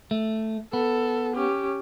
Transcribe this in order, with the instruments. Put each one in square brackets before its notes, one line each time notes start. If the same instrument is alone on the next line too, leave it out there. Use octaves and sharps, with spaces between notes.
[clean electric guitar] A3
[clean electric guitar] B3 [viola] A4
[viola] C#4 G4